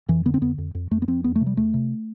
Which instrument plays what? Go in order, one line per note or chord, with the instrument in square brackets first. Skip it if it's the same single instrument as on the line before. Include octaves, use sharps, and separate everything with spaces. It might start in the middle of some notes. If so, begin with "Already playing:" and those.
[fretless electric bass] F2 E3
D3 B3
C4
F2 B3
F2
F2
F2 A3
B3
F2 C4
E2 B3
A3
C3
G3
E2 A3
C3